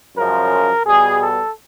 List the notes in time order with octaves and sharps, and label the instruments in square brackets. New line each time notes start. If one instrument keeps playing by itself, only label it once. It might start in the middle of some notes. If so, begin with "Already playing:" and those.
[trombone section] F#2 C#3 F3 G#3 A#4
B2 G3 B3 G#4
A4